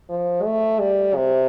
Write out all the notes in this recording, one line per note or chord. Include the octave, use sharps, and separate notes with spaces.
F3
A3
G3
C3